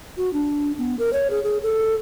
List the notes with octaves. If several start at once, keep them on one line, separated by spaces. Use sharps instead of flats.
F#4
D4
B3
A#4
C#5
G#4
G#4
A4